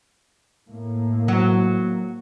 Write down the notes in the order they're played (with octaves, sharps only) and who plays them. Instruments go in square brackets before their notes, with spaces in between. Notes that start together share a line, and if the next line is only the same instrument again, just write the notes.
[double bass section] A2 A#3
[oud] F#3